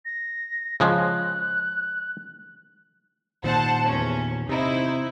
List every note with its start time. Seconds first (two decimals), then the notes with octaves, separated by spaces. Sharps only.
0.05 A#6
0.80 C#3 F3 G#3 F#6
3.44 A#2 D#3 C5 F#5 A5
3.86 E2 C#4
4.49 C3 D#4 E4 C5